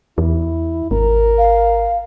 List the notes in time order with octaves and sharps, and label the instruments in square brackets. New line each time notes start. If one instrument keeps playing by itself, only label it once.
[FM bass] E2 [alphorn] E4
[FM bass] G#1 [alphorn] A#4
[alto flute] F5